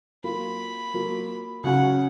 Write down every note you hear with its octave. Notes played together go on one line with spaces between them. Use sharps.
F#3 A#3 F4 B5
F#3 A#3 F4
C#3 F#3 C#4 F#4 F#5